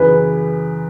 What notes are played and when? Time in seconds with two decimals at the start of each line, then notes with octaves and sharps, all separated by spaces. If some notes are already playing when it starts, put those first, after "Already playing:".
Already playing: F#2 C#3 E3 B4